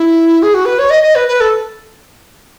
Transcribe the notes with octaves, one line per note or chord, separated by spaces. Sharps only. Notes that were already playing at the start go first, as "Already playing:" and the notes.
Already playing: E4
G#4
F#4
B4
C#5
D#5
D#5
B4
B4
A4